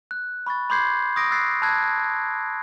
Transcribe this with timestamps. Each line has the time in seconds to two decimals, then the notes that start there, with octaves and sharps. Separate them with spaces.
0.11 F#6
0.46 B5 C#6 F#6 A6
0.70 B5 C6 D6 G6 G#6 C7
1.16 C#6 D#6 E6 A#6 D7
1.31 B5 E6 F#6 A6 C7
1.62 A5 B5 E6 F#6 G#6